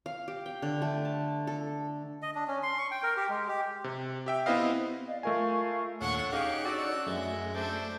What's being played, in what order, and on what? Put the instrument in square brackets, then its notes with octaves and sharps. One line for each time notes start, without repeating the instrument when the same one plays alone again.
[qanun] F5
G4
G5
D3
A3
A5
A4
[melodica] D#5
D4
C#4
C6
C#6
G5
A#4
G4
G#3
G4
[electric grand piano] C3
G4 E5 G5
B3 C4 E4 B4 D#5 F5
[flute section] D5 D#5 F5
[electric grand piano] A3 A#4 G#5 [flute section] F4 F5 C#6
[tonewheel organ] D#2 A#2 F5 [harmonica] D4 A4 C#5 [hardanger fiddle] F#5 C#6
[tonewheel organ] C#4 D#4 [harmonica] G4 G#4 D6 [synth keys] D#5 F5 [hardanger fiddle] F#5
[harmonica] D3 E6 [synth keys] F#4 D5
[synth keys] F#2 [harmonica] G#3 E5 [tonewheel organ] A3
[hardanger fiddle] D4 D5 [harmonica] A4 C5 E5